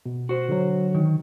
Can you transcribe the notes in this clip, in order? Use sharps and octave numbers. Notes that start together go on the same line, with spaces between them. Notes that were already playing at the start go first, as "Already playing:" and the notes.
B2
F#4 C5
D3 F#3
D#3